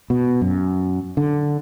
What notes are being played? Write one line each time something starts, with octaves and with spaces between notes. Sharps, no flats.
B2
F#2
D3